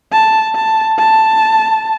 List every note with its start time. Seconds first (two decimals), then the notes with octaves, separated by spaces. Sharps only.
0.12 A5
0.55 A5
0.98 A5